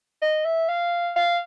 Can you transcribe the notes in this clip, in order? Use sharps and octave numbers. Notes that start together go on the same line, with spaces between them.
D#5
E5
F5
F5